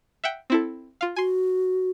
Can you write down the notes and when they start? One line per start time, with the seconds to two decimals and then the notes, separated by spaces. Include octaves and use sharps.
0.24 E5 F#5 G5
0.50 C4 E4 A4
1.01 F4 F5
1.16 F#4 G#5 C6